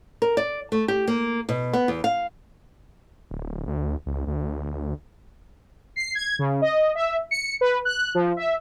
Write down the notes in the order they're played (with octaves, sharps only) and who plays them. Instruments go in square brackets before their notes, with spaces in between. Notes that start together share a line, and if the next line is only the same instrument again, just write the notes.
[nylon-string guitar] A#4
D5
A3
G4
A#3
B2
B3
E2
F5
[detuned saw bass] D1
D2
C#2
D2
[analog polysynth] C7
G#6
C#3
D#5
E5
C#7
B4
F#6
F3
E5